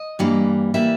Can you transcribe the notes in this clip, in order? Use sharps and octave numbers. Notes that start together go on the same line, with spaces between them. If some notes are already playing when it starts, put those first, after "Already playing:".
Already playing: D#5
G2 E3 G3 A#3
E3 G3 A#3 E5